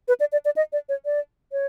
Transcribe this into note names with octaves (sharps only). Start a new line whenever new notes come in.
B4
D5
D5
D5
D#5
D5
C#5
D5
C#5